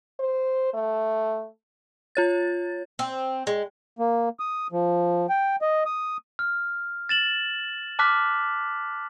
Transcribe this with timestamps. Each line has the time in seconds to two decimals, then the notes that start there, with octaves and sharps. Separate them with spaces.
0.20 C5
0.74 A3
2.15 F4 C#5 A6
2.99 C4
3.47 G#3
3.99 A#3
4.40 D#6
4.72 F3
5.29 G5
5.62 D#5
5.86 D#6
6.39 F6
7.09 A6 E7 F#7
7.99 A5 D6 F6 F#6 B6